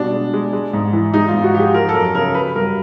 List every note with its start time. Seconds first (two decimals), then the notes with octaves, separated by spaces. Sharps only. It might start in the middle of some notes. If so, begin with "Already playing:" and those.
Already playing: B2 G3 D4
0.13 G#3
0.33 G#3
0.53 G#3
0.73 G#2
0.93 E3
1.14 G#3 D#4
1.28 F4
1.34 G#2
1.44 F#4
1.54 F3 G4
1.59 G#4
1.74 F3 A#4
1.89 A4
1.94 F#2 A#4
2.15 C#3 A#4
2.34 F#3 B4
2.55 G2 A#4